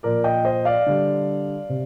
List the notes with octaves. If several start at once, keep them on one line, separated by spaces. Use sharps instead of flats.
A#2 F3 A#4 D5
D#5 G5
C5 D#5
D5 F5
D3 G3
C3